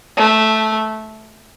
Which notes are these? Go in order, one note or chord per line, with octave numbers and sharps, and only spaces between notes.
A3